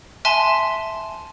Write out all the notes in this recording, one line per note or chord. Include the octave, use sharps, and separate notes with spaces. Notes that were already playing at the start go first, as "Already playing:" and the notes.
E5 G#5 A5 C6